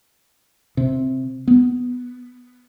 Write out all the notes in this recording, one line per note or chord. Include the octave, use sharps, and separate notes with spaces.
C3
B3